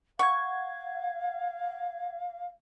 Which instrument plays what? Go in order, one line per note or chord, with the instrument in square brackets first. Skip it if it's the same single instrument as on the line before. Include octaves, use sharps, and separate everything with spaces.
[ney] F5 [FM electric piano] F#5 G#6 [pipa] C#6